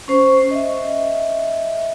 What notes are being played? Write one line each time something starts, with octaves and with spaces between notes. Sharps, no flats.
C#4 C5 C#6
D#5 E5